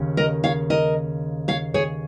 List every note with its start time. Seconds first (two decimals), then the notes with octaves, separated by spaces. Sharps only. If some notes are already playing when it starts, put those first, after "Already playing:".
Already playing: D#2 C#3 C#4
0.17 A#4 D#5
0.44 C#5 F5
0.70 A#4 D#5
1.48 C#5 F5
1.74 G#4 C#5